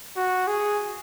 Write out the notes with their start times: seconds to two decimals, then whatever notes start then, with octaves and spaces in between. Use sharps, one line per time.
0.16 F#4
0.47 G#4